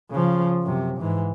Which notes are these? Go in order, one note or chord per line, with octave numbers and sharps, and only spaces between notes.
C#3 F3
F#2 C3
G#2 E3